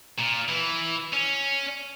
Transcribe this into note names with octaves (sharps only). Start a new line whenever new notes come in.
A#2
E3
C#4